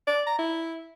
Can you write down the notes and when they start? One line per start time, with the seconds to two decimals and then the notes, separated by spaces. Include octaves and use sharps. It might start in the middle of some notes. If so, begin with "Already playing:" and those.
0.07 D5
0.27 A#5
0.39 E4